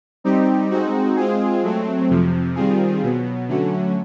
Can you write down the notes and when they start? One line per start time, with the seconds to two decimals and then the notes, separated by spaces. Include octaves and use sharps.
0.24 G3 C4 D#4 G4
0.70 G#3 C4 D#4 F#4
1.16 G#3 C4 F4 G#4
1.63 F#3 A3 C4
2.09 F2 C3 F3
2.56 D#3 G3 C4 F4 G#4
3.02 B2 F#3 B3
3.48 D3 F#3 A3 C#4 F#4